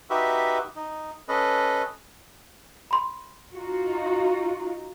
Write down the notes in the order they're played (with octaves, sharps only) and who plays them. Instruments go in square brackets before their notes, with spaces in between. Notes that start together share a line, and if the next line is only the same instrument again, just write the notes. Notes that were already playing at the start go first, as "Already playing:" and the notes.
[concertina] D#4 F#4 G4 B4 E5
D#4
C#4 A4 B4 D#5
[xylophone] B5 C6
[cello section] D#4 F4 F#4